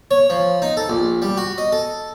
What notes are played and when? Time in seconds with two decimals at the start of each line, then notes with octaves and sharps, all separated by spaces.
0.11 C#5
0.30 F3
0.62 D#4
0.77 A4
0.89 A#1
1.22 G3
1.37 F#4
1.58 D#5
1.72 A4